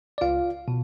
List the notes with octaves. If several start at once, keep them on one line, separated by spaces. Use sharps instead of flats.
D5
C#2 F4 F5
B2